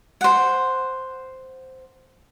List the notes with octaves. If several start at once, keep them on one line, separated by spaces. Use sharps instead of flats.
C5 F#5